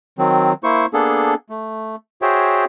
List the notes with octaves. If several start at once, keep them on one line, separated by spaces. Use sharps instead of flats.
D#3 F#3 C4
A#3 E4 C5 C#6
A#3 B3 D4 G#4 A4
A3
F#4 G#4 C5 C#5 E5 G5